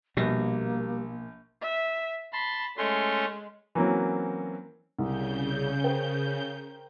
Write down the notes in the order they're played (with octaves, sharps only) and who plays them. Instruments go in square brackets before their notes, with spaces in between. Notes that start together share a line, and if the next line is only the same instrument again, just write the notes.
[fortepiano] A#1 [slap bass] B2 [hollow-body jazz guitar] G3 [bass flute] A#3
[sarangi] E5
[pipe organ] A5 C6 [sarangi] B5
[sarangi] G#3 [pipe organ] A3 C#4 C6
[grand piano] E3 F#3 A#3 C4 C#4
[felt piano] C2 [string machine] C#3 G6
[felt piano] A#4 C5 G5